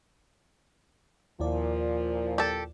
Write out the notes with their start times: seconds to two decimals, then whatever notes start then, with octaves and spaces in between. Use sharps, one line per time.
1.40 D#2 A#2 F3 E4 D5
2.38 G4 A4